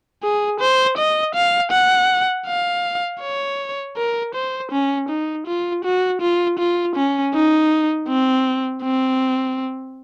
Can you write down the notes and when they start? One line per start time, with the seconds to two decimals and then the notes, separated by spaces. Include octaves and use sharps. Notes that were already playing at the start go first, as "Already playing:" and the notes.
0.23 G#4
0.61 C5
0.98 D#5
1.35 F5
1.72 F#5
2.47 F5
3.21 C#5
3.97 A#4
4.35 C5
4.72 C#4
5.09 D#4
5.47 F4
5.85 F#4
6.21 F4
6.59 F4
6.96 C#4
7.34 D#4
8.08 C4
8.83 C4